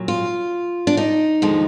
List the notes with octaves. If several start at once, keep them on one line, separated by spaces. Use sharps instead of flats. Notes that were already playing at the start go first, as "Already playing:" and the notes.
Already playing: A#2 F#3
F4
D4
D#4
D#2 D3 F3 G#3